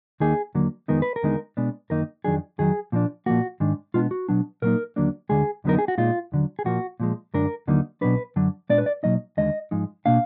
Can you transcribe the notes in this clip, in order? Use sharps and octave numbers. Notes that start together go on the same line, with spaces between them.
D#2 D#3 A#3 D#4 G#4
D#2 D3 F#3 A#3
F2 D#3 G#3 B3 D#4 A#4
B4
A#4
D#2 D3 G#3 B3 D#4
B2 G#3 B3 D4
F#2 D#3 A#3 D#4 A#4
F2 D#3 F#3 D4 G#4
F2 D#3 F#3 G#4
A#2 F3 A#3 D4
A#2 F3 A#3 F#4
G#2 D#3 G#3 D4
B2 G#3 B3 D4 F4
F#4
B2 F#3 B3 D4
A#2 F#3 A#3 D#4 A#4
D#2 D3 F#3 A#3 D4
D2 D3 G#3 G#4
F2 D3 F#3 B3 D#4 A#4
G#4
F#4
A#2 G#3 D#4 F4
D#2 D3 F#3
G#4
A#2 F3 A#3 F#4
A#2 F3 G#3
F#2 D3 G#3 D4 A#4
D#2 D3 F#3 A#3 D#4
B1 B2 F#3 D4 B4
F#2 D3 F#3 D4
A#2 G#3 B3 D4 D5
B4
D5
B2 F#3 A#3 D#4 D#5
D#2 D3 G#3 D#5
G#2 F3 G#3 D#4
B2 A#3 D4 F5